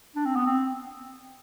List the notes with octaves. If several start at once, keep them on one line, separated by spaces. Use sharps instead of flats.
D4
C4
B3
C4